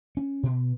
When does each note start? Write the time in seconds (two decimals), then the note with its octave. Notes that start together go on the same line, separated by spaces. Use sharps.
0.17 C#4
0.43 B2